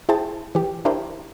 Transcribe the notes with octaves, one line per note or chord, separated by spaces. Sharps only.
E4 G#4 C5 G5 A5
E3 G4
D4 E4 G4 A#4 C5